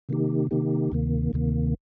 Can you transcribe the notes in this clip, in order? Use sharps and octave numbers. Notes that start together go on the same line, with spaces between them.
C3 D#3 A#3 D#4 G4
C3 D#3 A#3 D#4 G4
D2 C3 D#3 A#3
D2 C3 D#3 A#3